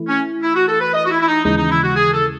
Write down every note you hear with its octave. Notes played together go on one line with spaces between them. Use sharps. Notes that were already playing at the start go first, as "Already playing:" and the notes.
Already playing: E3 A3 E4
C#4
E4
F#4
A4
B4
D#5
F#4
E4
E4
D#4
D#2 C#3 E3 G#3 D#4
D#4
E4
F#4
G#4
A4